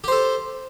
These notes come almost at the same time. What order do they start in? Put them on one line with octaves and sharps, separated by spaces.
G4 C5 A4